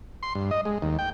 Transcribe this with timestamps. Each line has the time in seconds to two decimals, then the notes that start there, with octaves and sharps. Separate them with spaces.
0.23 C6
0.35 G2
0.51 D#5
0.65 G#3
0.82 D#2
0.99 G5